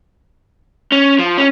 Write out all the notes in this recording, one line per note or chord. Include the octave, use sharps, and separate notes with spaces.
C#4
F3
C#4